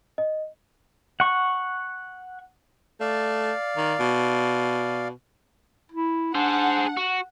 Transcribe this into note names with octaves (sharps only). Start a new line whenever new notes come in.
D#5
F#5 C#6
A3 D5 F5
D#3
B2
E4
D4 G#4 C5 F#5
F#4